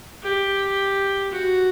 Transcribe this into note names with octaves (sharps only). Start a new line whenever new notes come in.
G4
F#4